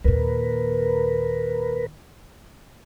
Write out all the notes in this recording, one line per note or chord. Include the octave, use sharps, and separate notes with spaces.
D#2 A#2 A#4 B4